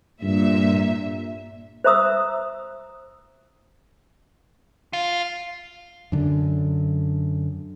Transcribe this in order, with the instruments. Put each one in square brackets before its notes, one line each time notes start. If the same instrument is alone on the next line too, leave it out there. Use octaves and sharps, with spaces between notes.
[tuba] G2 [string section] A#2 E5
[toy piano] C5 E5 A#5 D#6 E6
[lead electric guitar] F4
[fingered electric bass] F#2 D3